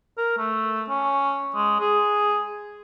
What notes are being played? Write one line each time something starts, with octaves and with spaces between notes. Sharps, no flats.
A#4
A3
C#4
G#3
G#4